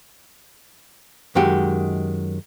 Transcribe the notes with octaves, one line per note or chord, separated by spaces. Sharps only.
F#2 D#3 G#3 F#4 G4